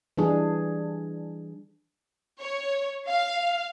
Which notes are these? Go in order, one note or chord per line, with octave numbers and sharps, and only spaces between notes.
E3 G3 D4 G#4
C#5
F5